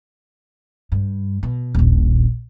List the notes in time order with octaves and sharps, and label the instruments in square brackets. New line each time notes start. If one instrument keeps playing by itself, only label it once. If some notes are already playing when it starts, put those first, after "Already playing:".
[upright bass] G2
B2
D#1 A#1